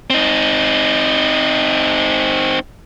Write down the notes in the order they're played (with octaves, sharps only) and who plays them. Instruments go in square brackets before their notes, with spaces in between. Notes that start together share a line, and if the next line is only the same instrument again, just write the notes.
[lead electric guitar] C4 D#4